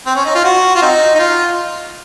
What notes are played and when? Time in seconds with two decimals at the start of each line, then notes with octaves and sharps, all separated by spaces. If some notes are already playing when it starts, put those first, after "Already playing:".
0.06 C4
0.16 C#4
0.25 D#4
0.35 F4
0.45 F#4
0.76 F4
0.82 C4 D#4
1.15 D#4
1.19 F4